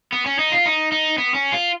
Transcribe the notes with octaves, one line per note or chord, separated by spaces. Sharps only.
B3
C#4
D#4
F4
D#4
D#4
B3
C#4
F4